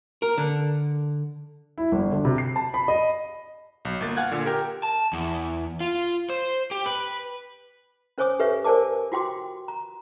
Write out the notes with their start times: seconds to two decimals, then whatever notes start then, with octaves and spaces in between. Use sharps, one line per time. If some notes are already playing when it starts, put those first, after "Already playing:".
0.22 A#4
0.38 D3
1.78 E4
1.92 G1
2.12 D3
2.25 C3
2.38 C7
2.56 A5
2.74 B5
2.88 D#5
3.85 B1
4.01 G1 A#3 A6
4.17 F5 F#5 G#5 F#6 G#6
4.32 A#2 D3
4.45 G4 A#4 G5
4.83 A5
5.13 E2
5.81 F4
6.30 C5
6.71 G4
6.86 B4
8.18 C#4 C5 C#5 G#5 D6 D#6
8.39 G4 A4 B4 C#5 E5
8.64 A#4 C5 D5 G#5 A5 D6
9.12 F4 F#4 G5 C6 D6
9.68 A#5